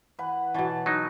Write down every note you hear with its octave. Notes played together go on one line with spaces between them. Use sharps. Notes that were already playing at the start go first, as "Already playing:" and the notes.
E3 B4 F#5
B2 E3 C#5 A5
F#3 D#4